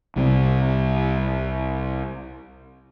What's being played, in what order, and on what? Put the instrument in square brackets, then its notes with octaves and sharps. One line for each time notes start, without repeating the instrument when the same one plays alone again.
[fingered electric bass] C2 C3 G3 C4